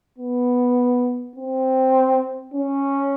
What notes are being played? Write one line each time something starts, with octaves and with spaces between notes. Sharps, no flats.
B3
C4
C#4